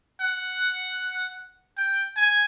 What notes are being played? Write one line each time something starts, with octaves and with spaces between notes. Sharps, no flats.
F#5
G5
G#5